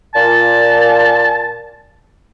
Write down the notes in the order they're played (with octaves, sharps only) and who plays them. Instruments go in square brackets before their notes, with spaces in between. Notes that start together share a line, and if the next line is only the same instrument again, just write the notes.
[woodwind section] A#2 [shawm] A5